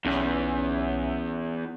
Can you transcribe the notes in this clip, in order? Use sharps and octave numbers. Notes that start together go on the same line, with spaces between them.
B1 E2 C#4 E5